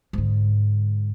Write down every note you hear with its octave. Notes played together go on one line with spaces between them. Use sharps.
G#2 D3